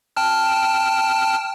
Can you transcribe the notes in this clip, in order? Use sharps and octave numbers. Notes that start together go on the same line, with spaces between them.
G5 A5 F6